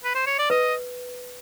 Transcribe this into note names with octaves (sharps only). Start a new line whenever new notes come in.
B4
C5
C#5
D5
B4 D#5